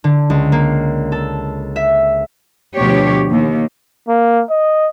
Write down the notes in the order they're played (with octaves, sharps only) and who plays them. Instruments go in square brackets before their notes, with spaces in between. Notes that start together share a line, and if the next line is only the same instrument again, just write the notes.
[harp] D3
C#2
A#3
A4
E5
[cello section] D2 B2 F3 D4 G4 C#5
D#2
[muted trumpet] A#3
D#5